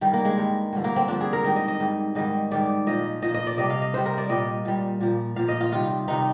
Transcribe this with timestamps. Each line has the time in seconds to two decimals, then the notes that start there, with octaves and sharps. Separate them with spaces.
0.01 G2 D#3 G3
0.13 A#3
0.25 G#3
0.37 G2 D#3 G3
0.73 G2 D3 F3
0.84 A#3
0.96 C4
1.08 G2 D3 F3 D4
1.21 G#4
1.33 A#4
1.44 G#2 D#3 G3 D#5
1.56 D#5
1.68 D#5
1.80 G#2 D#3 G3
2.15 G#2 D#3 G3 D#5
2.51 G#2 D#3 G3 D5
2.87 A#2 F3 D#5
3.22 A#2 F3 D#5
3.34 D#5
3.47 D5
3.58 C3 G3 D#5
3.70 F5
3.82 D#5
3.94 C3 G3 C5
4.06 A#4
4.18 D5
4.29 A#2 G3 D#5
4.65 A#2 G3
5.00 A#2 F3
5.36 A#2 F3 F5
5.48 D#5
5.61 F4
5.72 C3 D#3 G3 F4
6.08 C3 D#3 G3 D#4